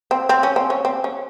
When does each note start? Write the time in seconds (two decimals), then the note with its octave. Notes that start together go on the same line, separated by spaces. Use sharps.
0.11 C4
0.29 C4
0.43 C#4
0.56 C4
0.70 C#4
0.85 C4
1.04 C#4